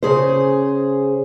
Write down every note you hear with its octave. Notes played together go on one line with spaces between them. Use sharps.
C#3 G#4 C5